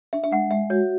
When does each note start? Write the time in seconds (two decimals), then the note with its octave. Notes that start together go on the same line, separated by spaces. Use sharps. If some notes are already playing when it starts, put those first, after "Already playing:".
0.13 D4 E5
0.24 E5
0.32 G#3 F#5
0.51 G#3 E5
0.70 F#4 C#5